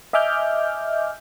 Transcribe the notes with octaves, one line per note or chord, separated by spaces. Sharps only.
D#5 E5 G#5 D6 F6 G6